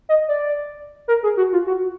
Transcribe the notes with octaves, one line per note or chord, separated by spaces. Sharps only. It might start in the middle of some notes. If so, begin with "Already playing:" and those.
D#5
D5
A#4
G#4
F#4
F4
F#4